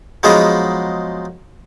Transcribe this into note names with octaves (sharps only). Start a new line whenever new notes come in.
F3 F#3 G#3 B3 D#4 G#4